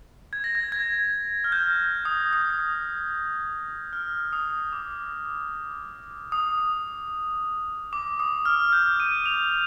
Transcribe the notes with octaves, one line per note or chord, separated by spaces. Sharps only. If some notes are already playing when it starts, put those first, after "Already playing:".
G#6
A#6
G#6
G#6
F6
G6
D#6
D#6
F6
D#6
D6
D#6
D6
D#6
F6
G6
D#7
F7